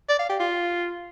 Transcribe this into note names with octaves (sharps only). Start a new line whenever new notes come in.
D5
F5
G4
F4